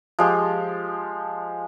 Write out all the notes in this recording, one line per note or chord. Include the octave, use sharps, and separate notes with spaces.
F3 G#3 G4